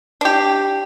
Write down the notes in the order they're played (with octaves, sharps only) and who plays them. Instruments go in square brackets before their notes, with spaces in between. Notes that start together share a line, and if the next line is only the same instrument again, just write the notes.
[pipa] D4 G4